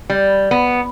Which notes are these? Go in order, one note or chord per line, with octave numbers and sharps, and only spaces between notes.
G3
B3